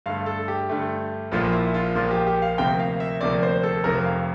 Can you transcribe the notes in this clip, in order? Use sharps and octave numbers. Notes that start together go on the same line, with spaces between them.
G2 D3 A3 F5
A4
G4
G2 D3 A3
A#1 A#2 F3 A#3 F4
E4
F4
A#1 A#2 F3 A#3 F4
G4
G4
F5
D2 C3 F3 A#3 G5
F5
E5
D2 C3 F3 A#3 D5
C5
A4
F1 F2 C3 F3 A#4
F5